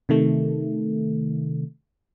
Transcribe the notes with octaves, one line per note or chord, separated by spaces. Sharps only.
C3 D#3 A3